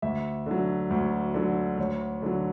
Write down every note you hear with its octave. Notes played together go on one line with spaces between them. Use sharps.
D2 E5
D3 F#3
D2
D3 F#3
D2 C#5
D3 F#3